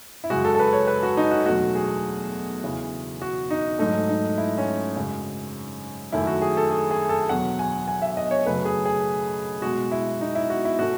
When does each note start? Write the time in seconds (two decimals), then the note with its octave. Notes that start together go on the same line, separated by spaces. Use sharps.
0.24 E4
0.30 F#2 C#3 G#3 F#4
0.45 A4
0.55 A4
0.59 B4
0.73 C#5
0.87 B4
1.03 F#4
1.17 D#4
1.31 F#4
1.46 E2 B2 F#3 A3 F#4
1.75 G#4
2.64 E2 C#3 E3
3.22 F#4
3.50 D#4
3.79 G#2 F#3 A3 D#4
4.09 D#4
4.38 E4
4.58 C#4
4.96 F#2 C#3 G#3
6.12 F#2 D#3 A3 E4
6.27 F#4
6.42 G#4
6.57 A4
6.71 G#4
6.91 G#4
7.09 A4
7.29 E2 B2 F#3 F#5
7.59 G#5
7.88 G#5
8.02 E5
8.17 D#5
8.31 C#5
8.46 F#2 C#3 F#3 A3 B4
8.65 G#4
8.86 G#4
9.62 B2 G#3 F#4
9.92 E4
10.21 D#4
10.35 E4
10.50 F#4
10.65 E4
10.79 A2 E3 A3 F#4